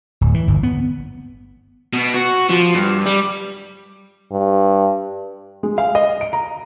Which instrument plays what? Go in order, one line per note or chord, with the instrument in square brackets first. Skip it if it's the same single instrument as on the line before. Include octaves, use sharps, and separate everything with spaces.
[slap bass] D1
E3
G1
B3
[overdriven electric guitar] B2
F#4
F3
G2
G3
[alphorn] G2
[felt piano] G#3
F5
D#5
D7
A#5